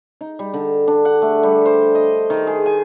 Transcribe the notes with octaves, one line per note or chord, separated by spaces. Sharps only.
D#4
G3
D3
D4
F#5
A3
G3
C5
D#5
D#3
G#4
G#5